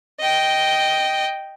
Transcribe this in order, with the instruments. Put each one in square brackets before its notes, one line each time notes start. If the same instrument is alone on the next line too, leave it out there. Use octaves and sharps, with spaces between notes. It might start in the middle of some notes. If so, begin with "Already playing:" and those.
[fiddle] D#5 G5